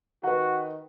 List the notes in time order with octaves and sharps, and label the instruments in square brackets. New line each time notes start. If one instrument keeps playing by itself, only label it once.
[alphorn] D#3 [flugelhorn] F#4 [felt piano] B4 F#5